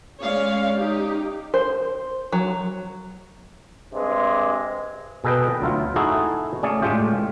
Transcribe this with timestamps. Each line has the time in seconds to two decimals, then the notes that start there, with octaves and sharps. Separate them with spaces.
0.20 G#3 C#4 C#5 D5 F5
0.75 D#4 G4
1.54 C5
2.32 F#3
3.93 G2 C3 G#3
5.24 B2 G#4 A4 B4 D#5 G5
5.61 D2 F#3 E4 F4
5.96 D#4 E4 F#4 G#4 A4
6.63 A3 C#4 G#4 D5
6.82 A2 G#3 A3 F4 G4